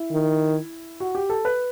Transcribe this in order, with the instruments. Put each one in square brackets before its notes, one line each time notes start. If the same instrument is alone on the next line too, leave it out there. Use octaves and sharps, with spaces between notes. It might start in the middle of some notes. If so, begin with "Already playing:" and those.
Already playing: [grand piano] E4
[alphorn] D#3
[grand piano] F#4
G4
A4
B4